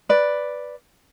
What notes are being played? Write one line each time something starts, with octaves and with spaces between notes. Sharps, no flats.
B4 D5